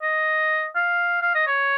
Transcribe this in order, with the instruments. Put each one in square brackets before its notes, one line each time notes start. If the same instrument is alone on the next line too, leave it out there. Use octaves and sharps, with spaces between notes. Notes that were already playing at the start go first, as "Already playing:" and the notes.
[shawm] D#5
F5
F5
D#5
C#5